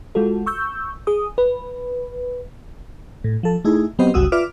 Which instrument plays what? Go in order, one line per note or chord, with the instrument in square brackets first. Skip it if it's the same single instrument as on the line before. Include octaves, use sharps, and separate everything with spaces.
[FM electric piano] G#3 F4 F#4 A4
C#6 E6 G6
G#4 D#6
B4
A2
F3 A4
A3 D#4 E4 G#4
F#3 B3 C4 G4 C5 D#5
G1 C#2 G3 F#4 D#6 E6
F4 B4 D5 E5 D6 F6